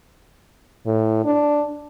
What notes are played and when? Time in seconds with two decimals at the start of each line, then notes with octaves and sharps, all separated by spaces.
0.86 A2
1.25 D4